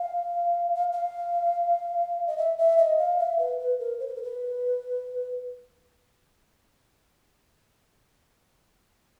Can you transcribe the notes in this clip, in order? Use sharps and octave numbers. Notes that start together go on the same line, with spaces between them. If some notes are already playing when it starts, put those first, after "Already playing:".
Already playing: F5
F5
F5
D#5
E5
E5
D#5
F5
E5
B4
B4
A#4
C5
B4
A#4
B4